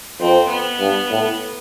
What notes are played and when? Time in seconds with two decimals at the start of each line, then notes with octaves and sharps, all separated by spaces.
0.20 F2 C4
0.49 B3
0.80 G2
1.10 A2